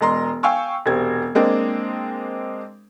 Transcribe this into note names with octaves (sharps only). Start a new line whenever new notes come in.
E1 G#3 A#5 C6
F5 G5 G#5 C#6 E6
E1 C3 C4 G#6
G#3 A#3 C4 D4